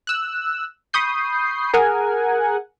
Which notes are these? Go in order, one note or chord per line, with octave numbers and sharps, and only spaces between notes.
E6 F#6
B5 C#6 D#6 G6 C7
G#4 A#4 F#5 G#5